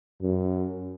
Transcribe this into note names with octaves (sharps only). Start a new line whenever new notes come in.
F#2